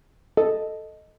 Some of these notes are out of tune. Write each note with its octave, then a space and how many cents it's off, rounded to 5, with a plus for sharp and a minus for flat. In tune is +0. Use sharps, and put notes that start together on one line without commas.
A4 +0 D#5 +0